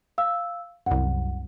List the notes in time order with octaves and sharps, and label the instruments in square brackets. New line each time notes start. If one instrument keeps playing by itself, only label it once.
[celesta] F5 E6
[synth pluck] C2 F#2 [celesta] F#5